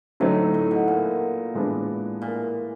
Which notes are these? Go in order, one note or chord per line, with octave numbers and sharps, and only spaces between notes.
A2 D3 F#3 A3 C4 D#4
A2
B2
A#2
A2 E3 G#3 B3 D4
A#2